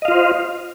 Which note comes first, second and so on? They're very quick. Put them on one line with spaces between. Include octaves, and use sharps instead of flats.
D#5 F5 F4 C5